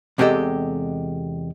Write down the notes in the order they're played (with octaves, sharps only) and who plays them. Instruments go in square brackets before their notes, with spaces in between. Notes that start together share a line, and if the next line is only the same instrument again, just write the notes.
[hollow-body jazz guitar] E2 C3 G#3 G4 A4 D#5